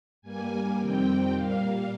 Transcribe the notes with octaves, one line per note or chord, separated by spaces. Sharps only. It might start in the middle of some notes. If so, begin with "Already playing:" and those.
G2 G3 A#3 G#5
F2 C3 D#3 G3 C4 G5
A#2 G3 A#3 F5